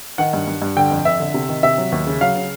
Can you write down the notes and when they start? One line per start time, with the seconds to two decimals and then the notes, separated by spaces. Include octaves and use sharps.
0.18 D#3 F#5
0.33 G2
0.47 G2
0.62 G2
0.76 D3 G5
0.91 F2
1.05 F2 E5
1.20 D3
1.34 C3
1.49 D#3
1.63 C3 E5
1.78 F#3
1.92 D#2
2.07 C#3
2.21 F#3 F5
2.35 C#3